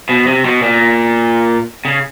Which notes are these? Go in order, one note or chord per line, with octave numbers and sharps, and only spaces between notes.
B2
C3
B2
A#2
C#3